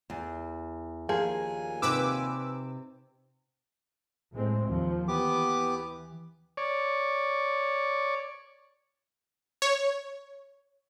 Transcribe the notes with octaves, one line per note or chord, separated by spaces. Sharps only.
E2
D#2 A#2 F3 A#3 G#4 G#5
C3 D#4 B4 D6 E6
A2 G#3 C4
D#2 F3
E3 B3 G4 D6
C#5 D5
C#5